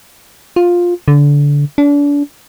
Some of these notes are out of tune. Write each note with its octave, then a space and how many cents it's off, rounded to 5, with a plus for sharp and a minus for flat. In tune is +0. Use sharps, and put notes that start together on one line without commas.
F4 +10
D3 -25
D4 -35